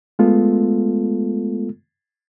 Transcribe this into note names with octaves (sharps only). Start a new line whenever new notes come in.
G#3 A3 B3 F4 A4